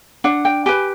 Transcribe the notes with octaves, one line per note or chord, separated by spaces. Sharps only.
D4 F#5
G5
G4 B4 G#5